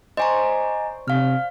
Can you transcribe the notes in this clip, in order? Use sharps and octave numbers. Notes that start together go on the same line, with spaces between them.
C5 D5 D#5 G#5 A#5 C#6
C3 F5 F6